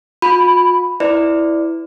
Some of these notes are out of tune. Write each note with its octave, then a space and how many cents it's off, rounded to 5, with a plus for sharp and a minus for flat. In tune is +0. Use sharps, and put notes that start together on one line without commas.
F4 +45 B5 +0
E4 +0 B4 +40 D5 +0